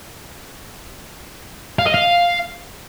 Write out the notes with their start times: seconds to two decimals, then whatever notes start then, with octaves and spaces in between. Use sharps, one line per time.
1.79 F5
1.87 D#5
1.94 F5